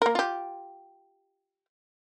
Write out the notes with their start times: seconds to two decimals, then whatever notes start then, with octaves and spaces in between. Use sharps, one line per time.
0.02 A#3 A#4
0.15 F4 G4